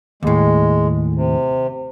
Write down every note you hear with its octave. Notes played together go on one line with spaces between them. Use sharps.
D#2 A2 G#3
C3